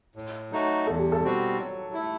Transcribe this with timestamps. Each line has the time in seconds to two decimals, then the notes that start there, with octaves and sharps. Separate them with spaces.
0.16 A2
0.51 F#3 A3 D#4 F#4
0.87 E2 A4
0.99 G4
1.12 A4
1.22 B2 G3 C4 F#4
1.59 F#3
1.94 A3 E4